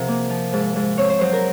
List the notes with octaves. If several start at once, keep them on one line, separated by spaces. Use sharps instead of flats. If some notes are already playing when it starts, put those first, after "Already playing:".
Already playing: C3 F3 F#4 G#4 A#4
A#3
F3
G#2
G#2
C4 C#5
C5
F#3 C5
A#4